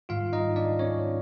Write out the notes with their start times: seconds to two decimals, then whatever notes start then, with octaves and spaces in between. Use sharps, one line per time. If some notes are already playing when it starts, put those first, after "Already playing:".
0.09 G#2 D#3 G3 F4 F5
0.33 D#4 D#5
0.56 D4 D5
0.79 C#4 C#5